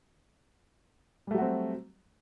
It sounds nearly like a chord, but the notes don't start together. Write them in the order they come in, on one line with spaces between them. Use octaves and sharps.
G3 A3 F#3 F#4 C4